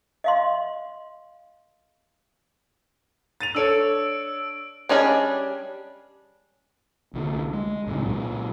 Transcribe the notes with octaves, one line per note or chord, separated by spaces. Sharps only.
D#5 F5 C6
A6 D#7 F7
D4 A4 C#5 E6 D7
G3 C#4 D4 G#4 D#5
C2 D3
G#3
C2 A2 C#3 C4
A#2 F#3